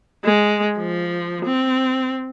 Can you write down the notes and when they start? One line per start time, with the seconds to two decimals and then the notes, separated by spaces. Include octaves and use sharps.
0.24 G#3
0.78 F3
1.45 C4